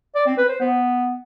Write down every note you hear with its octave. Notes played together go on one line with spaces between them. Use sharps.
D5
C4
B4
C5
B3